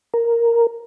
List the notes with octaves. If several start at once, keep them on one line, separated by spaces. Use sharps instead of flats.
A#4